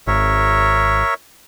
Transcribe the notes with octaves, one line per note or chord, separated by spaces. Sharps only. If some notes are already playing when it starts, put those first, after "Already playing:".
G#1 A#4 C#5 E5